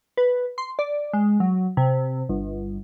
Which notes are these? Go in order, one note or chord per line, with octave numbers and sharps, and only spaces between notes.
B4
C6
D5
G#3
F#3
C3
G1